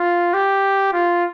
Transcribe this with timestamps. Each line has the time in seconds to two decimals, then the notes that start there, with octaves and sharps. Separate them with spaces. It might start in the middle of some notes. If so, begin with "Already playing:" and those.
Already playing: F4
0.34 G4
0.93 F4